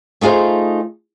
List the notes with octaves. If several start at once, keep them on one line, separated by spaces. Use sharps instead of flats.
A3 D#4 F4 G#4 C5